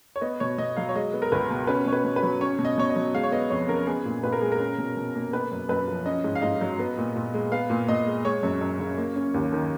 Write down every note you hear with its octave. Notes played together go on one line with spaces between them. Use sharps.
C#5
B3 D#5
B2 C#5
B2 D#5
F#3 F5
C#5
G#3 D#5
B3
A#4
C#2 B4
B2
C#4 B4
B2 C#5
B4
B2
B4
F#3
C#4 C#5
B2
D#5
B2 C#5
D#5
F#3
G#3 F5
C#5
B3 D#5
F2 C#5
C#3 A#4
B3 G#4
A#2
A#2 B4
A#4
G#3 G#4
A#4
C#4
B2
B2
A#3
B3 B4
F#2
F#2 B4
F3
C#4 D#5
G#2
F5
G#2 D#5
F#3
B3
A#2
A#2
G#3
B3 F5
A#2
A#2 D#5
G#3
G#3 C#5
F#2
F#2
C#3
A#3
C#4
D#2
D#3